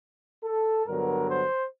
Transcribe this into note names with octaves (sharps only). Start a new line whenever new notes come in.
A4
G2 D3 F#3 B3 A#4
C5